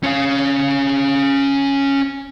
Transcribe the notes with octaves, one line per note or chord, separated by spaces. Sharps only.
C#4 F5